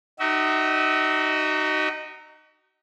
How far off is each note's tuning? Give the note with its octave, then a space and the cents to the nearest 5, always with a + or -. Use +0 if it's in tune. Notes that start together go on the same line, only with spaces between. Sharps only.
D#4 -15 F#4 +35 E5 -25